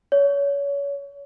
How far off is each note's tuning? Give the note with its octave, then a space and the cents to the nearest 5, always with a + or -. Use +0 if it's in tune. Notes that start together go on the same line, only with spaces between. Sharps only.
C#5 +30